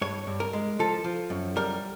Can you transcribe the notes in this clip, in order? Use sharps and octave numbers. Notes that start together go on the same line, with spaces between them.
G2 C#5
G2
A#4
G#3
F3 A4
F3
F#2
G3 A#4